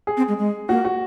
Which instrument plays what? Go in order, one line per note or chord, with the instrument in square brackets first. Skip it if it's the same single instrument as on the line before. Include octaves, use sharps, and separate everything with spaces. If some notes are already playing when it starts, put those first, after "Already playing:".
[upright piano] G#4
[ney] C4
G#3
G#3
[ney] A#3 [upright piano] F#4
[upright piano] F#4